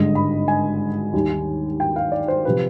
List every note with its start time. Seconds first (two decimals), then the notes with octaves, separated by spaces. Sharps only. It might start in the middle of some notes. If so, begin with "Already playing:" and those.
Already playing: G#1 G2 D3 G#3 D#5
0.15 B5
0.48 G#5
1.13 D#2 D#3 G3
1.80 G5
1.96 F5
2.12 D5
2.28 C5
2.45 C3 F3 B4